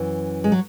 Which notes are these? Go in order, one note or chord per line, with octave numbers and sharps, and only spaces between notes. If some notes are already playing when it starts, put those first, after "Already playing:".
Already playing: F#2 E3
G#3
F#3